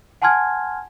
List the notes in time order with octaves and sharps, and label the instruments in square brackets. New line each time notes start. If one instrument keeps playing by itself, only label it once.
[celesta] F#5 G#5 A5 C6 F6 G#6